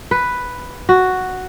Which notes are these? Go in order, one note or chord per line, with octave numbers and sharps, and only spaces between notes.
B4
F#4